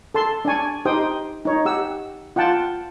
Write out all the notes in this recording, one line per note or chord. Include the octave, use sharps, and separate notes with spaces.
A4 A5 C6
D4 D5 G#5 C#6
D#4 G4 C5 G5 D#6
D#4 C#5
G4 F#5 E6
F4 F#5 G5 A5